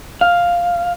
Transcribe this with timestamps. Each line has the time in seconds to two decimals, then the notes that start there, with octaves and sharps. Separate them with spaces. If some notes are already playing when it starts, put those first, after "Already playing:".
0.21 F5